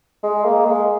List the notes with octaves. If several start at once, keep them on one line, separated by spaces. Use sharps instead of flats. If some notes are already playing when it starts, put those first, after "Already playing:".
G#3
A#3
G#3